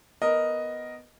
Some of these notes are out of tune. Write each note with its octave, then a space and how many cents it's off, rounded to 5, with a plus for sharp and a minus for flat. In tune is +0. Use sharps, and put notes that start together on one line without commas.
B3 +0 A#4 +0 D#5 +0